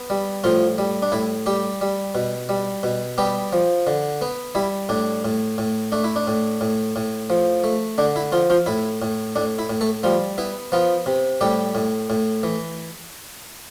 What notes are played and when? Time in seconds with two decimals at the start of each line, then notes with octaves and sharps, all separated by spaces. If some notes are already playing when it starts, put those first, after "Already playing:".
Already playing: B3
0.10 G3
0.44 A2 F3 F4
0.78 G3
1.02 D4
1.12 A2 E4
1.46 G3 G4
1.81 G3
2.15 B2
2.49 G3
2.83 B2
3.18 G3 B3 G4
3.53 F3
3.87 D3
4.22 B3
4.55 G3 E4
4.89 A2 D4
5.25 A2
5.58 A2
5.92 A3 D4
6.04 E4
6.16 D4
6.27 A2
6.61 A2
6.96 A2
7.30 F3
7.64 A3
7.98 D3 D4
8.16 E4
8.32 F3 F4
8.50 F3 F4
8.66 A2 E4
9.02 A2
9.36 A2 D4
9.59 E4
9.70 A2
9.81 A3 A4
10.03 F3 G3 F4
10.38 B3 E4
10.72 F3 B3 F4
11.06 C3
11.41 A2 G3 G4
11.75 A2
12.10 A2
12.43 E3